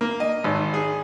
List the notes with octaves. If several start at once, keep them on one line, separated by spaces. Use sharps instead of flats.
A#3
D#5
G#1
G#4